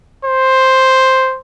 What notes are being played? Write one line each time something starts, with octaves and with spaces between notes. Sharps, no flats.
C5